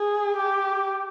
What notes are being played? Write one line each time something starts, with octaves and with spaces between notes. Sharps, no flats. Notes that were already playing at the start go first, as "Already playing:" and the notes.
Already playing: G#4
G4